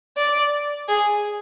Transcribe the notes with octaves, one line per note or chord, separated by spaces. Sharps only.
D5
G#4